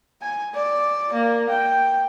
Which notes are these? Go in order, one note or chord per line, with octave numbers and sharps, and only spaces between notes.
G#5
D5
A#3
G5